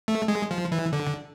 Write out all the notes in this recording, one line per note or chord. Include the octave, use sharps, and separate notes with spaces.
A3
G#3
F3
E3
D3